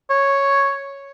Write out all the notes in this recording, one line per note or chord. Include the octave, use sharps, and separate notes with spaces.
C#5